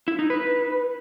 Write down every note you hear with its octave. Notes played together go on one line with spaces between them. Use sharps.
E4
D#4
B4